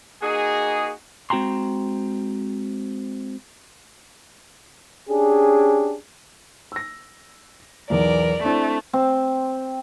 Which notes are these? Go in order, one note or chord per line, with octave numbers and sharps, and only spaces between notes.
A#3 D#4 F#4 G#4
G#3 C4 F#4 G5 A#5 C6
C#4 D4 G4 G#4
E6 A#6
B1 E2 E3 A#4 D5
A3 C4 D4 E4
C4